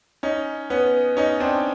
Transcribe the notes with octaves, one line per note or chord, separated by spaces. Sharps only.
C#4 D#4
B3 C#4
C#4 D#4
C4 D4